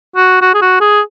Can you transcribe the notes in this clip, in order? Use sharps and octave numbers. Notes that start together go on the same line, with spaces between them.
F#4
F#4
G#4
F#4
G#4